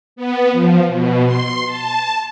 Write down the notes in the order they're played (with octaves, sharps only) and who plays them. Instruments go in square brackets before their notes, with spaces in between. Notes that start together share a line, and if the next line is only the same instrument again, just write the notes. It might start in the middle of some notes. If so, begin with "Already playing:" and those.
[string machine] B3
F3
B2
C6
A5